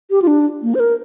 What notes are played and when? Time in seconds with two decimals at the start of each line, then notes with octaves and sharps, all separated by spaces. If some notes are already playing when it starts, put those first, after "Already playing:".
0.10 G4
0.22 F4
0.27 D4
0.63 A#3
0.75 C5
0.80 A#4